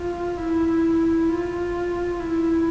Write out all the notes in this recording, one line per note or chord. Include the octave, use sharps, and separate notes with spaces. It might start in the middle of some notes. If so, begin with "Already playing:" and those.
Already playing: F4
E4
F4
E4